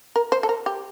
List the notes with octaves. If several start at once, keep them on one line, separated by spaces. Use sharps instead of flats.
A#4
C5
A4
A#4
G4